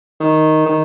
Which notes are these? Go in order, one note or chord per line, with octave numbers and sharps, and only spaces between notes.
D#3
D#3